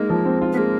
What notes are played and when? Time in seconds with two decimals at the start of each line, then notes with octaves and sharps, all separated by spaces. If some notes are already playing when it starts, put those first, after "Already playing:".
Already playing: G#3 A#3 D#4
0.10 F3
0.25 C4
0.42 F4
0.52 B3
0.57 G#3 A#3